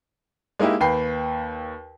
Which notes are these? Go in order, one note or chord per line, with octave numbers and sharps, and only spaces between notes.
G#3 A#3 D#4 E4 G4
D#2 B4 G5 B5 C7